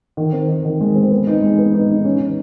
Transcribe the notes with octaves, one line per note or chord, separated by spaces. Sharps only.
D#3
C4
D#3
D#3
G#3
C4
B3
D#4
G#3
B3
D#4
D#4
C#4
C#4